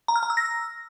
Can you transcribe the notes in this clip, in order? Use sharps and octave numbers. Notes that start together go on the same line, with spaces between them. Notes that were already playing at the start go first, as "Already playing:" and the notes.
A#5
F6
A#5
E6
A#6